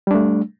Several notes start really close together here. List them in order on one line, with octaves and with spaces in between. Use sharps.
G3 D4 A3